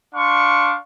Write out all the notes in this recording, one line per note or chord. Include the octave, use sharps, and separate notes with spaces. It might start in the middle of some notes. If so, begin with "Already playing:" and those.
D4 F5 C6 C#6